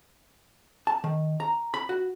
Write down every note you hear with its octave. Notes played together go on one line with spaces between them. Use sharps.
A5
D#3
A#5
B5
F#4